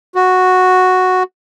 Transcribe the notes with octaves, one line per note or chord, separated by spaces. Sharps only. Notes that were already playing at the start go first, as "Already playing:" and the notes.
F#4